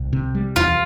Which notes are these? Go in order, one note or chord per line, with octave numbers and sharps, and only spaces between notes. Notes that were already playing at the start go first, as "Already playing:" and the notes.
Already playing: C2
C3
G3
E2 F4